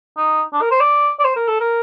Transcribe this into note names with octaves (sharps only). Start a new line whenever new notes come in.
D#4
D4
A#4
C5
D5
D5
C5
A#4
A4
A#4